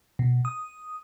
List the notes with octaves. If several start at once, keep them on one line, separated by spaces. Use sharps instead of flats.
B2
D#6